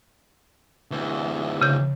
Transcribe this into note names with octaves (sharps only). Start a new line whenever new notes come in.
D2 E3
C#3 G6